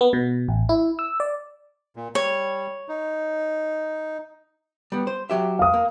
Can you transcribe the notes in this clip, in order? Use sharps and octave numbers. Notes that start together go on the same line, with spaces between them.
B3
B2
A1
E4
E6
D5
A#2
G3 C#5
D#4
G3 B3
C5
F#3 G4 E5
F5 D#6
A#3